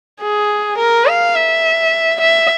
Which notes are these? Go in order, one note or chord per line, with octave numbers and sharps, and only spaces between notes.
G#4
A#4
F5
E5
E5